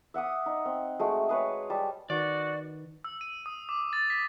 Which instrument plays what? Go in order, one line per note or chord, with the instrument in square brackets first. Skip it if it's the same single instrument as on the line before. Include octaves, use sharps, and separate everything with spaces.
[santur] E5 F#5 D6 D#6
D#4
C4
G#3 A3 F#4
G#4 B4 C#5
G3 A5
[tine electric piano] D#3 D#4 B4 [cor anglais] F#4 [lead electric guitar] D5
[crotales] E6
D#7
D#6
D6
A6
B6